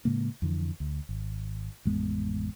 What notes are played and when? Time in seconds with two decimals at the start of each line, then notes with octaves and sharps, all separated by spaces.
0.05 A2 C#3 G#3 A#3
0.42 F2 D3 E3
0.80 D2
1.09 G#1
1.85 A1 F2 G#3 B3